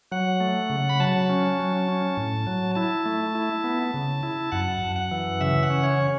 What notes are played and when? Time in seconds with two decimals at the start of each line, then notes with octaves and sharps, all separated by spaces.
0.12 F#3 F#5
0.40 A3
0.70 C#3
0.89 B5
1.00 F#3 A5
1.29 C#4
1.59 F#3
1.88 C#4
2.17 A2
2.47 F#3
2.75 E4 A5
3.06 A3
3.35 E4
3.64 B3
3.94 C#3
4.23 E4
4.52 F#2 F#5
4.81 F#2
4.96 F#5
5.11 E3
5.41 C#3 E5
5.63 F#5
5.70 C#4
5.84 C#5
5.99 C#4